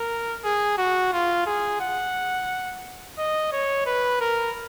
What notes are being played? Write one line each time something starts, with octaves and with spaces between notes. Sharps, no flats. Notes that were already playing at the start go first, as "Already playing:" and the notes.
Already playing: A#4
G#4
F#4
F4
G#4
F#5
D#5
C#5
B4
A#4